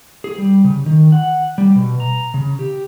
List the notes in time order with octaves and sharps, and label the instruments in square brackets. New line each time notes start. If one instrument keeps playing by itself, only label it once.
[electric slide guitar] G#4
G3
C#3
D#3
F#5
G3
B2
A#5
C#3
G4